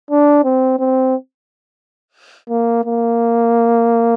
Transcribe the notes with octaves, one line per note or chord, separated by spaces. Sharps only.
D4
C4
C4
A#3
A#3